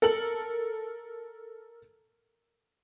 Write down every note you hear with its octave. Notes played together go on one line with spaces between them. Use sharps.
A4 A#4 F#7